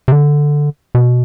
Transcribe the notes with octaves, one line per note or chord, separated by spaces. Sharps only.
C3
D3
B2